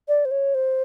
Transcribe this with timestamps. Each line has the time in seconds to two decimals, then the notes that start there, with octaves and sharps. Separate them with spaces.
0.08 D5
0.25 C5
0.31 C#5
0.55 C5